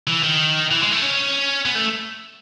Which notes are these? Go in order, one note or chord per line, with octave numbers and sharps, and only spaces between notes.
E3
D#3
E3
G#3
A3
C#4
B3
A3